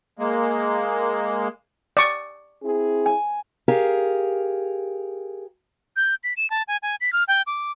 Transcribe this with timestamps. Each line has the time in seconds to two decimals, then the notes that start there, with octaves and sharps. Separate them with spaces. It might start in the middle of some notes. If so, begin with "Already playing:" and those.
0.19 G#3 A#3
1.97 D5 C#6
2.63 C4 E4 G#4
3.06 G#5
3.68 G4 G#4 A#4 F5
5.96 G6
6.24 B6
6.37 E7
6.50 A5
6.68 G#5
6.83 G#5
7.01 B6
7.13 F6
7.28 G5
7.47 D6